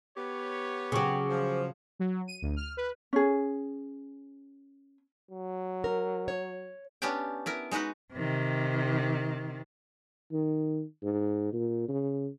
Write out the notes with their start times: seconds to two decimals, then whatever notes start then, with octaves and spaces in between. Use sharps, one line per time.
0.17 B3 G4 C#5
0.92 C#3 F#3 G#4 G5 C#6 D6
1.29 F3 C5
1.99 F#3
2.27 D#7
2.42 D2
2.56 F6
2.77 B4
3.13 C#4 G#4
5.31 F#3
5.84 A#4
6.28 C#5
7.02 B3 C#4 D4 G4 G5
7.46 B3 E4 A#4
7.71 G#3 D#4 F#4 B4 F#5
8.13 C3 D#3
10.32 D#3
11.03 G#2
11.53 A#2
11.88 C#3